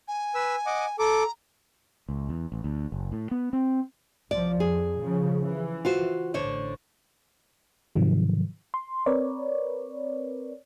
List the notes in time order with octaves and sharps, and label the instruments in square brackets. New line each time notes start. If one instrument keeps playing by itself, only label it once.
[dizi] G#5
[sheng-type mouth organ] B4 E6
D#5 F#5 D6
[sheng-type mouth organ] A4 D6 [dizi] A#5
[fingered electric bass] C#2
E2
A1
D2
F#1
A2
B3
C4
[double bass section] C2 F3 [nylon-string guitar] D5
[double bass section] F2 [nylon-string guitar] G#4
[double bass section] C#3 F3
E3
[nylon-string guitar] F4 F#4 C5
[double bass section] A1 [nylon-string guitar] D3 C5 C#5
[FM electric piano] G#2 C3 D#3 F3 F#3
C6
C4 A#4 B4 C#5 D5